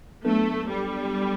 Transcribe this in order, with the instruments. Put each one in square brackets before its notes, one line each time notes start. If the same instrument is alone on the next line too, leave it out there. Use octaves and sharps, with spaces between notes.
[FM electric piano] F#3 B3 D4 A4 [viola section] A3
[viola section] G3